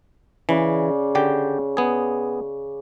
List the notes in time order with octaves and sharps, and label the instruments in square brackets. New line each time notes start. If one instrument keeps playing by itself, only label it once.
[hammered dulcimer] C#3 D5 C6 [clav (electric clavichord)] E3
[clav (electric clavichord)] D3 G4 G5
B3 G#4